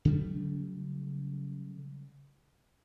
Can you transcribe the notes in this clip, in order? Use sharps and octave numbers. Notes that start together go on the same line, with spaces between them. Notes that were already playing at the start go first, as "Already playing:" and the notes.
C#3 F#3 G3 A3